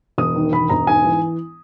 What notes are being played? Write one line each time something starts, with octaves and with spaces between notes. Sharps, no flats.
E1 D#6
D#3
E1 B5
E1 A#5
G#2 G#5
E3